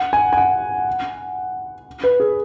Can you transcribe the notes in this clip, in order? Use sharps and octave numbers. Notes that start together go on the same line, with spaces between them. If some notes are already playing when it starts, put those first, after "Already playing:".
Already playing: F#5
G#5
G#5
F#5
B4
G#4